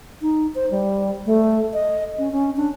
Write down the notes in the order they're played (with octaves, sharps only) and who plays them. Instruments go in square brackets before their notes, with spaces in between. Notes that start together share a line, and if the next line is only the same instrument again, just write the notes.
[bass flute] D#4
C5
G3
A3
D#5
C#4
C#4
D4